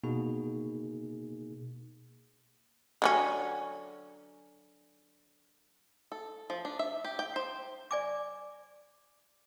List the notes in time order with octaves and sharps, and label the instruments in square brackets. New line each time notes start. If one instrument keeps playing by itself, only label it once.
[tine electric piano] B2 A#3 D#4 G#4
[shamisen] D3 F#3 C#4
[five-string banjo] A4
F3
D4
E5
G4
G5
C5
[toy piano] D5 G#5 D6